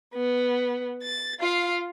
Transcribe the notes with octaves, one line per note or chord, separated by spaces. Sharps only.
B3
A6
F4 F5